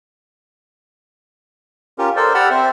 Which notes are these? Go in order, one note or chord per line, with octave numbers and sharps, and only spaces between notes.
C#4 F4 G4 A#4
A4 A#4 C5 D5
G4 D5 F#5 B5 E6 F6
C4 C5 E5